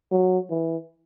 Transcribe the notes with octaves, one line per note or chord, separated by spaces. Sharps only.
F#3
E3